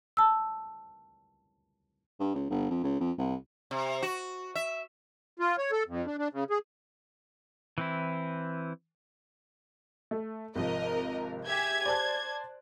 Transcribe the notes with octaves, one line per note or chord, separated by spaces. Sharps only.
A5 E6
G2
C#2
G1
F2
C#2
F2
C2
C3
F#4
E5
F4
C#5
A4
F2
D4
D4
C#3
G#4
E3 C4 E4
A3
G#1 C3 F3 A#4 D#5
G4 G#4 E5 G#6
C5 D5 A5 F#6